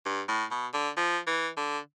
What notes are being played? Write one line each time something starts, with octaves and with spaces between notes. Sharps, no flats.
G2
A2
B2
D3
F3
E3
D3